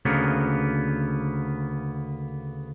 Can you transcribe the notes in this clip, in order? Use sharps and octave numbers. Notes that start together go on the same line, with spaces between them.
D2 C#3 A#3 B3